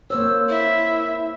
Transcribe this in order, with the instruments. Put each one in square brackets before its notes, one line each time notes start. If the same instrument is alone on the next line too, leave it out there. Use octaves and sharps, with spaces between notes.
[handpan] A#3 C5 C#5 [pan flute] E6
[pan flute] E4 [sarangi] E5